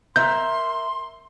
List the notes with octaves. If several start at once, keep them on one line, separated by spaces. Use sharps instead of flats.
A#4 E5 C6 G6